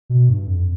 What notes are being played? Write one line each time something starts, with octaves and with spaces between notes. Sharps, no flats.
B2
G2
F2